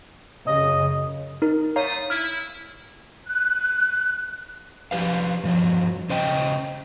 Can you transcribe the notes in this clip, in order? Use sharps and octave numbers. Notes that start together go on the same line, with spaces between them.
F#2 C#3 D#5
D#4 A#4
A3 C5 C#5 F5 A#5 D#6
E4 F6
F#6
F3 G4 B4 F5
G2 F3 F#3
C#3 C5 D#5 G5